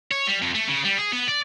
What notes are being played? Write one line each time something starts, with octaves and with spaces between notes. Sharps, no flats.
C#5
G3
F2
A3
C#3
G3
G#4
B3
D5